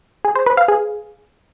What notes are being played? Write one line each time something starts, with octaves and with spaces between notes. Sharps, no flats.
G#4
C5
B4
F5
G#4